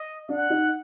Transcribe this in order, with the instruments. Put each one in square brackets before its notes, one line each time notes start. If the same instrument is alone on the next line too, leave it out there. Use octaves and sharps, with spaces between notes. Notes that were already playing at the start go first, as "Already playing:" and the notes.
Already playing: [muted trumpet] D#5
[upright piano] D4 [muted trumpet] F#5
[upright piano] D#4